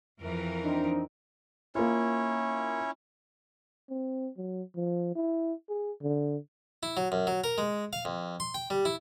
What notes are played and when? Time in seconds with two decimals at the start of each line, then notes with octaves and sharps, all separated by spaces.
0.21 F2 E3 A#4
0.64 C4 D4 D#4
1.75 A#3 C#4 E4 F4 C#5
3.90 C4
4.37 F#3
4.76 F3
5.16 E4
5.69 G#4
6.02 D3
6.83 E4
6.97 F#3
7.12 F#2
7.27 F#3
7.44 A#4
7.58 G#3
7.93 F5
8.05 F2
8.40 C6
8.54 G5
8.70 G3
8.85 E4